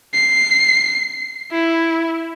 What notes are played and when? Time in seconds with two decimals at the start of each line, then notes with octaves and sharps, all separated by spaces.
0.13 C7
1.51 E4